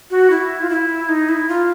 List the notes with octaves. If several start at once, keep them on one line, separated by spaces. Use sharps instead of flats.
F#4
E4
F4
E4
D#4
E4
F4